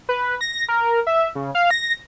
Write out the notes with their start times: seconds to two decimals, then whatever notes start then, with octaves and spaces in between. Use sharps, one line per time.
0.09 B4
0.41 A#6
0.69 A#4
1.07 E5
1.35 C#3
1.55 F5
1.71 A#6